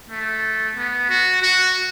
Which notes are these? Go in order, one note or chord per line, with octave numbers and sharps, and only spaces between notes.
A3
B3
F#4
F#4